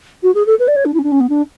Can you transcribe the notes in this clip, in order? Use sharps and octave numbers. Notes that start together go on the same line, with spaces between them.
F#4
G#4
A4
B4
D5
C#5
D4
E4
C#4
D4
C#4
B3
D4